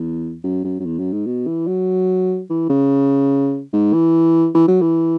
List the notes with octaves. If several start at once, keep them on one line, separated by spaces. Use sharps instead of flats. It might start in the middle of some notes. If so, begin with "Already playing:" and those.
Already playing: E2
F#2
F#2
F#2
E2
F#2
G#2
B2
E3
F#3
E3
C#3
G#2
E3
E3
F#3
E3